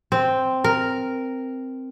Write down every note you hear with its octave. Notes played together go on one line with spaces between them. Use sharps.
C4
A#4